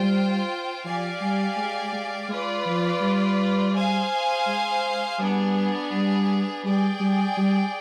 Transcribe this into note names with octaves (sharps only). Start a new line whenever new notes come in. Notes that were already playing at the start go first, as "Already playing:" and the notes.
Already playing: G3 F4 C5 G5
F3 G4 D5 F5 G#5
G3
G#3
G#3
G#3 F4 B4 D5
F3
G3
G#4 C5 F5 G#5
G#3
G3 B3 D4 G#4
G3
G3 G#4 D5 G5
G3
G3